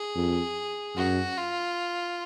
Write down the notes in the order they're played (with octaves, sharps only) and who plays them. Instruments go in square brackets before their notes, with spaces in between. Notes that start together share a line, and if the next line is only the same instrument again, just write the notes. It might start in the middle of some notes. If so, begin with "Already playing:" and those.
Already playing: [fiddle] G#4
[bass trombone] F2
[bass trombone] F#2 [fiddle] F#4
[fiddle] F4